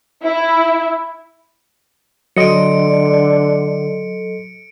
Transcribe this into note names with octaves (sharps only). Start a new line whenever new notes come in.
E4
D3 F#3 A4 D#5 C6 C#7 D7